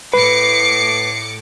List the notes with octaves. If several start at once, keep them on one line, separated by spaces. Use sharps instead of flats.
A2 B4 D6 C7 C#7